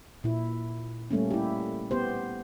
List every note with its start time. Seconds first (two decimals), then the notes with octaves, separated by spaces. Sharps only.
0.24 A#2 E4
1.11 G3 A3 A#3 C#4
1.31 E4 G4
1.91 B3 G4 C5